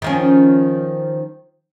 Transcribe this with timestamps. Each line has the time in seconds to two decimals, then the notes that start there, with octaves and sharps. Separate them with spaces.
0.02 D#3 F3 C#4